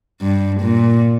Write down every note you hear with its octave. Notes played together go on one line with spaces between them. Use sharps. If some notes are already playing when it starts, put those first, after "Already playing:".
G2
A#2